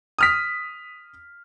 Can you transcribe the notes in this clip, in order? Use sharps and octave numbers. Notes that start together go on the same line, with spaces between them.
D#6 F6 B6